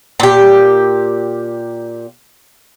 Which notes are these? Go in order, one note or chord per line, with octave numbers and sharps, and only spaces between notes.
A#2 G4